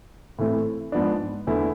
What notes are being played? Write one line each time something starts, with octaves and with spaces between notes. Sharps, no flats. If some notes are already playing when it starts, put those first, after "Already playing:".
A2 E3 A3 C4 E4
G#2 F3 B3 D4
E2 D3 A3 E4